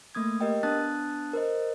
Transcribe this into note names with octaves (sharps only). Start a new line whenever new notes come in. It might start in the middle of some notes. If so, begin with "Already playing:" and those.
A3 A#3 D#6 G#6
G4 A#4 D#5 G5
B3 D4 A5 D#6 F#6 A6
A#4 C5 D#5